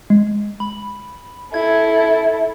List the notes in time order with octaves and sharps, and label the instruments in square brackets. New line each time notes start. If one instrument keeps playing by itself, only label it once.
[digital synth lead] G#3
B5
[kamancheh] E4 A4 [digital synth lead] G#6